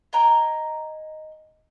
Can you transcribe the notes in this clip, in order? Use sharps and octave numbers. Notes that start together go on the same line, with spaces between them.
D#5 G5 G#5 A#5